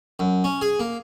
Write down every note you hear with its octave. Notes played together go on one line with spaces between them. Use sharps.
F#2
C#4
G#4
A#3